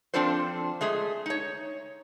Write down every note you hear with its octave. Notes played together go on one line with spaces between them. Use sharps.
F3 C4 D4 F4 A4 C5
G#3 A3 G#4
D#4 C#5